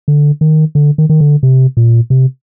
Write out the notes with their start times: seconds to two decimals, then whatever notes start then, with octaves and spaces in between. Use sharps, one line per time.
0.08 D3
0.41 D#3
0.75 D3
0.98 D#3
1.10 D#3
1.20 D3
1.43 C3
1.77 A#2
2.10 C3